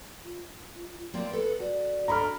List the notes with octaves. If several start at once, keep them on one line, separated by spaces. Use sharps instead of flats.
F4
A#3 C4 D5
B3 A4 B4
F#4 D5
D4 F#4 A4 A#5 B5 F6